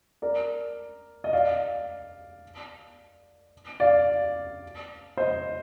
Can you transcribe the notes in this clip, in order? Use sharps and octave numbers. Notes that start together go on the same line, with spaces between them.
A#4 D5
D#5
D5 F5
D5 F5
C5 D#5